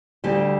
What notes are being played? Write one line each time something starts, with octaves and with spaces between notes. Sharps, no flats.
D2 D3 G3 G4